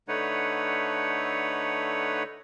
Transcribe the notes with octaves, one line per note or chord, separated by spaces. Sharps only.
D3 A3 D#4 B4 C#5 F#5